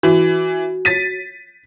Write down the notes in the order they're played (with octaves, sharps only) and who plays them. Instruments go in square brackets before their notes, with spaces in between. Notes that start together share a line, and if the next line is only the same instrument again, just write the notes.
[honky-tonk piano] E3 [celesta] F#4
[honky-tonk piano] A6 B6 D#7